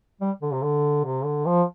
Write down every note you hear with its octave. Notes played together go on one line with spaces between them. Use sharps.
G3
D3
C3
D3
C3
D3
F3